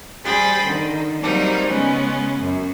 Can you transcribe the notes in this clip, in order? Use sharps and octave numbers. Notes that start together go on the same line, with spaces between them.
G3 G#4 C5 G5 B5 A6
D3 D#3
F#3 G3 A#3 C4 D#4
C#3 G#3 B3 C#4
F#2